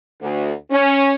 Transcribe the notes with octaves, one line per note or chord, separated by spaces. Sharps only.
D2
C#4